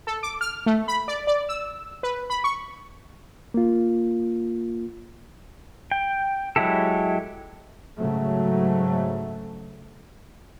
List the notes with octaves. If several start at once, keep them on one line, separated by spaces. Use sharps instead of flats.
A4
D6
F6
A3
B5
D5
D5
E6
B4
B5
C#6
A#3 F4
G5
F#3 G#3 E4 G4 A4
G#2 C#3 F#3 A3